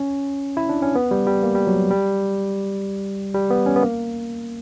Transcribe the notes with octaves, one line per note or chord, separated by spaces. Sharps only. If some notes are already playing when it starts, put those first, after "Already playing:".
Already playing: C#4
E4
D4
C#4
B3
G3
G3
A#3
G3
F#3
G3
G3
B3
C#4
B3
A#3